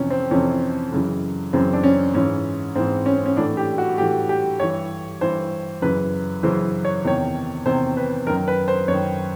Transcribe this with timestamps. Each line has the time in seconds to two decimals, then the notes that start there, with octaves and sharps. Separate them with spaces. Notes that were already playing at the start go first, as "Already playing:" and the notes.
Already playing: F2 C3 E3 C#4
0.10 C4
0.31 F2 C3 E3 C#4
0.92 F#2 C#3 E3
1.53 F#2 C#3 E3 C4
1.73 D4
1.84 C#4
2.14 G#2 E3 C#4
2.76 G#2 E3 C4
3.06 C#4
3.26 C#4
3.37 A2 E3 D4
3.57 G4
3.78 F#4
3.98 A2 E3 G4
4.29 G4
4.60 G2 E3 C#5
5.21 G2 E3 C5
5.82 F#2 C#3 E3 B4
6.43 F#2 C#3 E3 C5
6.85 C#5
7.05 E2 C3 D#3 C#5
7.65 E2 C3 D#3 C5
7.97 B4
8.27 F#2 D#3 A#4
8.48 B4
8.68 C5
8.88 F#2 C#5
8.93 D#3